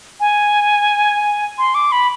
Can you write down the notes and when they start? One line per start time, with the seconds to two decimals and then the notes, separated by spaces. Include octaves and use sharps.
0.20 G#5
1.58 C6
1.75 D6
1.92 B5